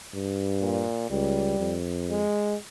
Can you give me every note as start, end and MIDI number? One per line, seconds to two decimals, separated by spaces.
0.14 0.85 43
0.61 1.08 46
1.10 1.59 37
1.10 1.76 55
1.59 2.26 41
2.10 2.56 56